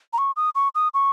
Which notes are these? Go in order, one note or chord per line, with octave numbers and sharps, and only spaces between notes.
A#5
C#6
D#6
C#6
D#6
C#6